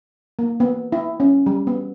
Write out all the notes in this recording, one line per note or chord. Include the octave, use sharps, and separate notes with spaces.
A#3
B3
E4
C#4
G3
B3